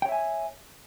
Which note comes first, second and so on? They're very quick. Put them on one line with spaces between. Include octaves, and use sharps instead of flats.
G5 C#5 E5 G#5